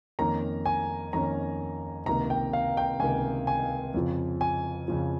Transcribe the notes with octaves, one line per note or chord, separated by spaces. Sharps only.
F2 D#3 A#3 C#4 A#5
G#5
F2 D#3 A#3 C#4 A#5
C#2 C3 D#3 A#3 A#5
G5
F5
G5
C#2 C3 D#3 A#3 G#5
G#5
F2 C#3 F3
G#5
F2 C#3 F3